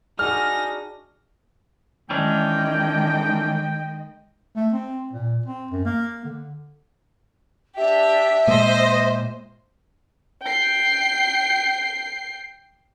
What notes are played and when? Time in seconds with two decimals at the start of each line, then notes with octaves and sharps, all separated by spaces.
0.19 D4 D#4 F#4 G#4 F6 A#6
2.10 D#3 E3 G#3 C#4 D4 D#5 G5
4.56 A3
4.73 C4
5.13 A#2
5.46 C4
5.71 F#2
5.85 A#3
6.24 D3
7.77 D4 G4 E5
8.47 A#2 G#3 A#3 C5 D#5
10.43 G5 C7